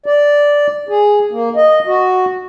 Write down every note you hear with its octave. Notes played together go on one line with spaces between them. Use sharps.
D5
G#4
A#3
D#5
F#4